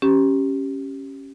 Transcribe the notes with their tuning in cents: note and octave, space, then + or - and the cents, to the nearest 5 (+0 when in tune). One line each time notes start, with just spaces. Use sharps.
C#4 -10 G4 -15